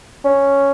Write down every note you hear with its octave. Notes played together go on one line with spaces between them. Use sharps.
C#4